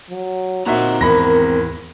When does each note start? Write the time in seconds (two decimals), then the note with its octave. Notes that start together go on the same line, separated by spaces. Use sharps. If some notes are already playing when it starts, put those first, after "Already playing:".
0.10 F#3
0.66 A#2 C4 D#4 F#4 E5 A#5
1.01 G#1 E2 A#4 B5 A#6